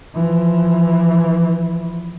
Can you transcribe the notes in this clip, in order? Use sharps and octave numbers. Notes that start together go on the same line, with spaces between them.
E3 F3